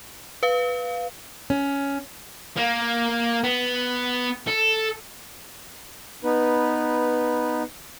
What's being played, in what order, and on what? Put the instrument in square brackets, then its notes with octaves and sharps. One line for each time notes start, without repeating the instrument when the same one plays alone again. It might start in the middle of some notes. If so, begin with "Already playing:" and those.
[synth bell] B4 F5
[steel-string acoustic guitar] C#4
[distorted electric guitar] A#3
B3
A4
[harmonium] B3 D#4 B4